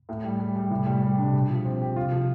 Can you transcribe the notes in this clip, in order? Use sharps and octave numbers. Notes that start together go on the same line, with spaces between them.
A2
G3
G3
G3
A2 C3
G3
G3
D4
C3
B2 G4
F3
C4
G4
C3 F4
F3